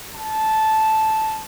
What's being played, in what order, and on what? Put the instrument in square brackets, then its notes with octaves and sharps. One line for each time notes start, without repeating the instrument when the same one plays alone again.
[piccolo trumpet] A5